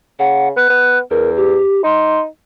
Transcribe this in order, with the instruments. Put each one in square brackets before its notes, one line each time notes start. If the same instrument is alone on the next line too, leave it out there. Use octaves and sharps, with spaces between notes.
[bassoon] C#3 [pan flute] F#5
[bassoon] B3 [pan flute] F#6
[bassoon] B3
[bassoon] E2 [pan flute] A#4
[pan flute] G4
[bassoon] D#4 [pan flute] C6